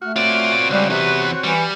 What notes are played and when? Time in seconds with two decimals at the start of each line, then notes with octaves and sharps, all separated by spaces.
0.02 A3 F#4 F6
0.16 C4 F4 F#4 C#5 D5 D7
0.70 C#2 C#3 G3 F#6
0.90 E2 C3 B3
1.44 E3 G3 C#7